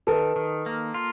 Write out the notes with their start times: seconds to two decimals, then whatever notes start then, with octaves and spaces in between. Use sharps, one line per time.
0.07 D#3 A4 B4
0.36 D#3
0.66 A#3
0.94 F4